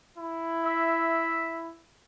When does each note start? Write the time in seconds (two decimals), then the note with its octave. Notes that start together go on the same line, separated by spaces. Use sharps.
0.18 E4
0.65 E5